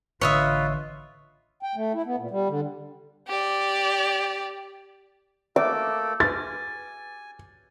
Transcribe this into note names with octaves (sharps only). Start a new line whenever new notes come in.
A1 D3 F4 B4 C#5 D#5 E5
G5
A3
E4
B3
A#2
G3
D3
G4 D5
A3 A#3 A4 B4 E5 D6
G#4 B4 G#5 A6